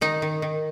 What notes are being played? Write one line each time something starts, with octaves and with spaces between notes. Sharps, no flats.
D#3 D#4
D#3
D#3